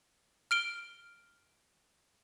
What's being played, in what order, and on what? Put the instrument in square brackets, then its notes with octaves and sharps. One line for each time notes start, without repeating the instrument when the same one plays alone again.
[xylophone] F6 D7 G7